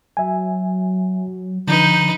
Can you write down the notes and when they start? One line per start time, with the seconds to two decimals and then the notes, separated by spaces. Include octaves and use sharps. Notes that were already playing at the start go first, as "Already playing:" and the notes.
0.17 F#3 E5 G#5
1.67 D3 F3 D4 D#4 B4 G6